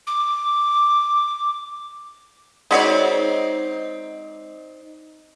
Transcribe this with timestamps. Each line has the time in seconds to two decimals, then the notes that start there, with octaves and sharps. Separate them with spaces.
0.07 D6
2.71 G#3 C4 D#4 F#4 C#5 D5